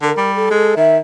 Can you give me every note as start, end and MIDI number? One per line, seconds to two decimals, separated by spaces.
0.02 0.12 50
0.02 0.34 70
0.17 0.50 55
0.35 0.75 69
0.51 0.75 56
0.77 0.99 51
0.77 0.96 76